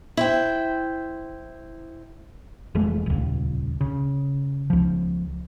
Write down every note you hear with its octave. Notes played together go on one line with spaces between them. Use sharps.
E4 C5 G5
F1 E3 G#3 A3
D#1 C#2
C#3
C#2 F3